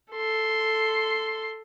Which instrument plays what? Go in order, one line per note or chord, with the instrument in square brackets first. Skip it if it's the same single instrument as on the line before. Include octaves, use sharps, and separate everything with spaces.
[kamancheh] A4 C6